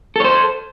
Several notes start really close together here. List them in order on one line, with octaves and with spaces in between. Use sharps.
A4 C#5 C5